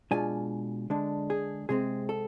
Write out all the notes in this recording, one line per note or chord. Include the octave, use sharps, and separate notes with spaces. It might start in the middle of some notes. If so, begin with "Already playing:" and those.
B2 G#3 D4 F4 G#5
D3 G#3 D4
G#4
C3 G#3 C4 G#4
A4